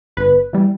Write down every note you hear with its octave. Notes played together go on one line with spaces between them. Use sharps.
G1 B4
E3 G3